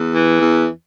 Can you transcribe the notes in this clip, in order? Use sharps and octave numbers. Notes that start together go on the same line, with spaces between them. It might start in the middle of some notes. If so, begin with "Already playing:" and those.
Already playing: E2
E3
E2